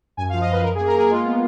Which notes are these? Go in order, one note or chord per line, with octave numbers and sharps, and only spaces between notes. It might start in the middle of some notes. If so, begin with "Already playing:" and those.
F#2 G#5
F5
F3
D#5
F#2 B4
F#2 A#4
G#4
A#3
A#4
A#3 G#4
G#3 F4
B3